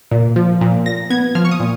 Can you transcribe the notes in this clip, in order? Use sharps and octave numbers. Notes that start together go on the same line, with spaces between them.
A#2
F3
A#2
A#2 A#6
B3 G#6
F3 F6
C#6
D#6
A#2